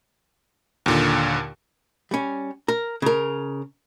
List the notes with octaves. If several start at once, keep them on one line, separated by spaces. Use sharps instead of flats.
D#2 A#2 D3
G3 C#4
A#4
C#3 A#4